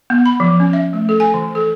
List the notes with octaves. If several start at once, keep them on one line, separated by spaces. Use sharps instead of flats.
B3
B5
F3
C#4
E5
A3
A4
G#5
E3
A4